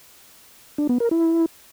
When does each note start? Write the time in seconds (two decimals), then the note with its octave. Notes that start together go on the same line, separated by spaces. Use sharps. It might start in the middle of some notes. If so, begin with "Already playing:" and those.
0.78 D4
0.89 B3
1.00 A#4
1.11 E4